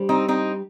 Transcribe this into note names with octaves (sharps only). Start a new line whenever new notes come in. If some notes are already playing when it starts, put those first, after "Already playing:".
Already playing: G3 D4 G4 C5
C4 D#4
C4 D#4